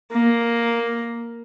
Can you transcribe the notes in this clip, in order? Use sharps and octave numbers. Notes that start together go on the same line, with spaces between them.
A#3